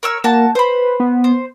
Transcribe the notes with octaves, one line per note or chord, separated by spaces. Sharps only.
A#4 C#5 E6
A#3 F#4 A5
B4 C5 B5
B3
C5